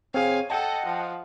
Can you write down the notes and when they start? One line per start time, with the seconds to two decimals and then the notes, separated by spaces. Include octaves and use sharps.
0.14 C4 G#4 C#5 F5 G#5
0.50 A4 D#5 F#5 G5 A5
0.86 F3